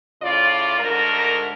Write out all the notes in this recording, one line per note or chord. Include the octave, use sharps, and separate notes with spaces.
A2 C#3 F4 D5
D2 G#2 A#4